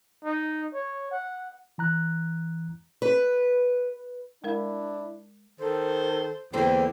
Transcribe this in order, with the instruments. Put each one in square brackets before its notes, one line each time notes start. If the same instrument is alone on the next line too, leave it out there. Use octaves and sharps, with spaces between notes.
[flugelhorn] D#4
C#5
F#5
[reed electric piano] E3 A#5 F#6
[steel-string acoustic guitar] B4
[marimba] G#3 A#4 F5 [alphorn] D4 [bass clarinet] E4
[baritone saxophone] D#3 [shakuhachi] A4 [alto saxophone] C5
[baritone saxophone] E2 [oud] D3 A#3 C5 [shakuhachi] G5